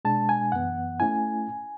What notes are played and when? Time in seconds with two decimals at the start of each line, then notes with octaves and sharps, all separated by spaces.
0.05 B2 G#3 D4 A5
0.29 G#5
0.52 F#2 E3 B3 F#5
1.00 A3 C#4 E4 G#5